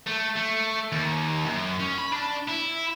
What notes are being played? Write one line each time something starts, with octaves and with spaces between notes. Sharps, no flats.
A3
A3
D#2
F#2
C#4
B5
D4
E4